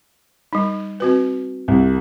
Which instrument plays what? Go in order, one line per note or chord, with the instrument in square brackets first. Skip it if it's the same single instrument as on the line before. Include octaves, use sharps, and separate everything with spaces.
[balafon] G3 D#4
C4 F#4 B4
[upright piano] C2